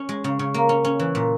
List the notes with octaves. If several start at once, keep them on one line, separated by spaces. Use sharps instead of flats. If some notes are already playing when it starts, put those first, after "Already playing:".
Already playing: C#4
G#3
C#3
C#3
A#3
C#4
C#4
E3
A#2